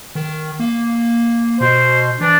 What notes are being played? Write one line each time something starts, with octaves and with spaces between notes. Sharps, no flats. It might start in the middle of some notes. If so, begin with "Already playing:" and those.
D#3
A#3
B2 C5
E3 D4